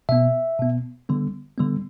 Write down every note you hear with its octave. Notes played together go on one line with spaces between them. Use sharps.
B2 B3 E5
B2 B3
D3 G3 B3
D3 G3 B3